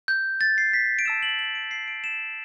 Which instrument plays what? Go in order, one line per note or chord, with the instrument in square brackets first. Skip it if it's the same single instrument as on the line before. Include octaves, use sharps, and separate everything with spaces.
[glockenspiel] G6
A6
C7
B6
D7
A5 E6 G6 E7
F#7
F#7
D7
C7
D7
E7